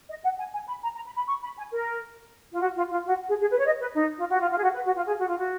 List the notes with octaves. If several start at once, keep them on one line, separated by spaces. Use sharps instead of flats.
D#5
F#5
G#5
G#5
B5
A#5
A#5
B5
B5
C#6
B5
G#5
A#4
F4
F#4
F4
F4
F#4
G#4
G#4
B4
C#5
D#5
B4
D#4
F4
F#4
F4
F4
G#4
F#4
B4
F#4
F4
G#4
F#4
F4
F#4